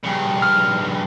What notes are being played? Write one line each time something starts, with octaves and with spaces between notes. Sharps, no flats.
G2 C#3
F6